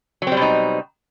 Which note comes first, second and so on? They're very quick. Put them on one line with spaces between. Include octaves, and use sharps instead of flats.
F#3 C4 G3 B2 D#4